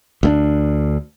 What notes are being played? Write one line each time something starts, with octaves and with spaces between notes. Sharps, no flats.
D2 A3 D4